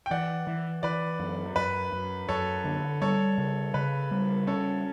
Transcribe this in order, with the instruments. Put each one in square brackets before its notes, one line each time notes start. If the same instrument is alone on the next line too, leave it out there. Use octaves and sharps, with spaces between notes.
[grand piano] G5
[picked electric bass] E3 [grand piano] D5 F#5
[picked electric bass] E3
[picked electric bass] E3 [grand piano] B4 D5
[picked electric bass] F#2
[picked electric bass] F#2 [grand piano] B4
[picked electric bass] F#2
[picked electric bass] F#2 [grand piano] A4 C#5
[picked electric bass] D3
[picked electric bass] G3 [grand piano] A4 C#5
[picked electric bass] C#3
[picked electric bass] C#3 [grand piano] B4
[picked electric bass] G3
[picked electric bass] C#4 [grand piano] A4 C#5